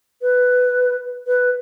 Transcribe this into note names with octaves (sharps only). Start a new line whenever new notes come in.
B4
B4